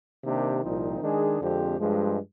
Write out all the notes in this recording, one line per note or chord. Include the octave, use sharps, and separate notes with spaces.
C3 D#3 A#3 D4 G4
C2 A#2 F3 C4 D#4
D#3 G#3 D4 G#4
F2 D3 G#3 C4 G4
G2 F3 G#3